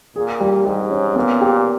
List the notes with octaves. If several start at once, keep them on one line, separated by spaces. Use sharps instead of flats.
A#2 G#4
G3
G#2 G3
C#4
A#2 B3
G4